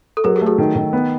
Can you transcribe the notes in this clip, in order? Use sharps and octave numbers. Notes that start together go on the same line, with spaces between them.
A4
F#3 G#4 A#4
G4 A4
A3
F#4 G#4
D#3
D#3
B3